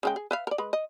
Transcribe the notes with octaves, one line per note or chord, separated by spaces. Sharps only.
C#3 G#3 G5
G#4
B4 E5 F5
A#4 D5
G#3 B4
D#5